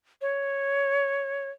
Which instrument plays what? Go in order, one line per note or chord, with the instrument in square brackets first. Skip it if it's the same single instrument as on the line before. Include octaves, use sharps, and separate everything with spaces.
[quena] C#5